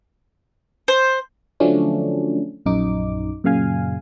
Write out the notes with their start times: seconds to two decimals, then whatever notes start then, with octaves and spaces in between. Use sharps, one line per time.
0.88 C5
1.60 D3 F3 F#3 A3 C#4 D4
2.66 A#1 F#2 D#4 D6
3.44 F#2 A#2 C#3 F5 G#5